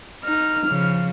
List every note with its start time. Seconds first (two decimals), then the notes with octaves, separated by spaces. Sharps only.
0.24 D#4 F6
0.66 C#3 F3